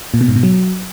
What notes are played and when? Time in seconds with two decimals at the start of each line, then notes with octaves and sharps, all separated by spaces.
0.14 A#2
0.21 B2
0.28 G#2
0.36 B2
0.43 F#3